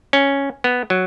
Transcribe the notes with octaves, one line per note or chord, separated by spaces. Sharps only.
C#4
B3
F#3